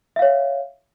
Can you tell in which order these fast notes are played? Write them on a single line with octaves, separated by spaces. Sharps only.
E5 F5 C#5